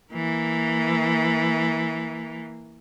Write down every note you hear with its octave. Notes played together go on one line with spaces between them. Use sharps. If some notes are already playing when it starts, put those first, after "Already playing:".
E3 A#3